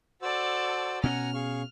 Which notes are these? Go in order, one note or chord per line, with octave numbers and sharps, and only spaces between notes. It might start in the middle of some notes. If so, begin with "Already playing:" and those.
F#4 A4 C5 D5 E6
B2 C#4 F#5 G#5 A#5 F6
G#4 F5 C#6